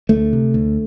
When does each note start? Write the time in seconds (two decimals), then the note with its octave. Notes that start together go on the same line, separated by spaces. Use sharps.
0.09 D2 A3
0.33 C3
0.54 D2